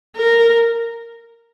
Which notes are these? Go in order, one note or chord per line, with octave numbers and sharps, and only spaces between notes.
A#4